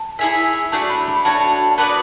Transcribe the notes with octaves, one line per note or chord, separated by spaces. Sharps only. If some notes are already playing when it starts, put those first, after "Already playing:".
Already playing: A5
E4 G#4 C#5 E5 G#5
A3 D4 F#4 C#5 A5
B5
B5
A3 D4 F#4 C#5 A5
A5
B3 F#4 B4 D5 B5